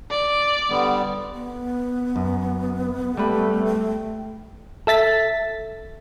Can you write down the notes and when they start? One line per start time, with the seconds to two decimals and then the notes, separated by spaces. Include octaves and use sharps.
0.11 D5
0.70 D3 G3 B3
1.35 B3
2.16 F#2
3.17 G3 A3 B4
3.66 G5
4.87 A4 E5 A6 B6